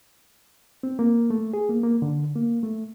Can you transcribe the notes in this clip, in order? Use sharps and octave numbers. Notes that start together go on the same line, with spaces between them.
C4
A#3
A3
G#4
A#3
A#3
D3
A#3
A3